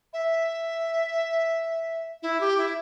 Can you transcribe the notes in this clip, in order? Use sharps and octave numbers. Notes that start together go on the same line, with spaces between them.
E5
E4
G4
E4